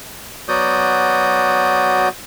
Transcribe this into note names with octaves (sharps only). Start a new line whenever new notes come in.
F#3 B3 F#4 D5 D#6 G6